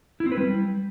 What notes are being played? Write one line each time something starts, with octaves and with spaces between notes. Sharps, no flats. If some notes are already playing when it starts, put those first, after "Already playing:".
E4
C4
B4
G3